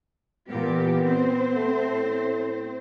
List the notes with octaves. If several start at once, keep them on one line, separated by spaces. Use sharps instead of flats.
A#2 E3 B3 G4
C4 C5
A3
A2